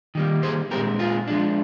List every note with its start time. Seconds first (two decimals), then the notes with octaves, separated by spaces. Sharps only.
0.15 D#3 G3 A#3
0.43 G#4 C5
0.71 A#2 G#3 C4 G4 A#4
0.99 F4 G#4
1.27 F3 G#3 D4